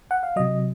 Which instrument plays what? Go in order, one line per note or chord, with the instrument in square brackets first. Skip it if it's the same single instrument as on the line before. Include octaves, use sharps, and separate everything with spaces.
[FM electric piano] F#5
F5
C3 F#3 D#5